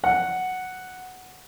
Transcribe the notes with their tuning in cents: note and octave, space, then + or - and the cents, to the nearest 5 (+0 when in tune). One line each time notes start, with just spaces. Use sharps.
F#5 +0